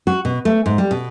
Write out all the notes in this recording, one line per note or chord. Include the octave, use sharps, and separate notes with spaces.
F#4
B2
A3
G#2
G3
B2